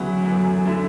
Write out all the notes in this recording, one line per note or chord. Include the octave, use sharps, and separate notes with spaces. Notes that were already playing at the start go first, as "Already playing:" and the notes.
Already playing: D2 C#3 E3 F#3 B3
F#2 E3 A3
D3 A3 E4